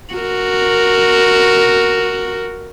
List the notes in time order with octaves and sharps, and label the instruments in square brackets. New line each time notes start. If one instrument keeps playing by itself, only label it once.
[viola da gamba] F#4 A#4